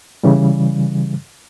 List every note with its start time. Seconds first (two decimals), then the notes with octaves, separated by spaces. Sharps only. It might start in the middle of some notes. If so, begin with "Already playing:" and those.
0.23 C#3 E3 G3